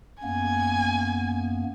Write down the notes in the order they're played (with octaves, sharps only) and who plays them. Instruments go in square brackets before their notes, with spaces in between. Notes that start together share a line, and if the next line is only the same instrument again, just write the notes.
[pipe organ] F#2 A#3 B3 [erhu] G#5